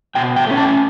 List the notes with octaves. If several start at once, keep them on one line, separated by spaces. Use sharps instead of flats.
B2 G5
G5
A3 C#4
A5